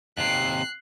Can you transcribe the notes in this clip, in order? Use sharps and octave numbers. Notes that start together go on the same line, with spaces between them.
D#2 C3 F#6 C7